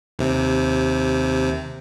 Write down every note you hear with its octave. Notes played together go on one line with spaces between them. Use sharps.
D#2 C3